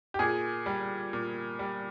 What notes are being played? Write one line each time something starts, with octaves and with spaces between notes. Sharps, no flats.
G4
A#2 G#4
G3
A#2
G3